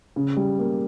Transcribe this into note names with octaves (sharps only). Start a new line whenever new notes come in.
C#3
G3
A#3